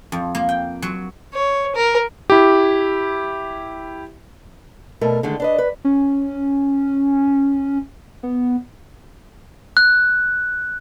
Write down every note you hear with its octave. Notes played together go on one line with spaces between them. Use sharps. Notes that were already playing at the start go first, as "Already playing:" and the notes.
F2
A#3
G5
F#3
C#5
A#4
E4 G4
B2 A3 A#4
D3 D#3 G#3 A3
D4 B4 D#5
B4
C#4
B3
F#6